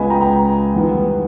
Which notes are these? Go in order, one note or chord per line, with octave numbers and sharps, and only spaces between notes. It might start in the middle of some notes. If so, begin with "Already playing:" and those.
Already playing: C#2 C#3 G#3 B3 G#5 B5
G5 A#5
G5 A#5
E2 D#3 G3 B3